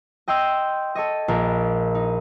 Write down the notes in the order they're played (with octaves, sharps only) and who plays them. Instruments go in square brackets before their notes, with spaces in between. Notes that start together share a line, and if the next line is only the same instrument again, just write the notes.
[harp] D#5 G5 C6 E6 G6 G#6
A4 C#5 D#5
A#1 A#4
D#4